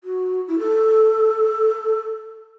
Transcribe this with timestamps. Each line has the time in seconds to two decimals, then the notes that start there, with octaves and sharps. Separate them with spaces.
0.04 F#4
0.48 E4
0.59 A4